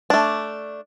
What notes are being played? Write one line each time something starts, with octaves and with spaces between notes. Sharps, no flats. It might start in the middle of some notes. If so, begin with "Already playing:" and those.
A3 D4